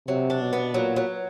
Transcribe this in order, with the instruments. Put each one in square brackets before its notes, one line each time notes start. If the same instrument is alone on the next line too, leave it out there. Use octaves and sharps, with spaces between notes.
[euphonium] C3 [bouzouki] F#3
[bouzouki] D4
[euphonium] B2
[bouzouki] B3
[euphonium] A#2 [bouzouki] F#3
[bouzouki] F#3